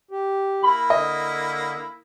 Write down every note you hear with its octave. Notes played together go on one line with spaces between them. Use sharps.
G4
A#3 E4 B5
D3 D#5